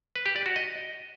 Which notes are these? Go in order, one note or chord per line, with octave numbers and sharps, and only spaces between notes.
B4
G4
D5
F#4
D#5